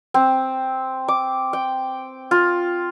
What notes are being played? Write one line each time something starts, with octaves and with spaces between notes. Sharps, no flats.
C4
D6
G5
F4